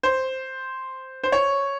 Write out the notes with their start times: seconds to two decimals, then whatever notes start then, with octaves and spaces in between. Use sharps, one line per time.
0.03 C5
1.23 C5
1.32 C#5